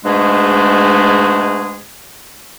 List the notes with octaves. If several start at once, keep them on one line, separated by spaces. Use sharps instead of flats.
G#2 B2 G#3 A3 D4 G#4